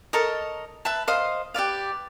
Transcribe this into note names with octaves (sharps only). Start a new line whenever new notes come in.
A4 A#4 C#5 D#5
B4 E5 A5
C5 D#5 F5 D#6
G4 B4 D5 F5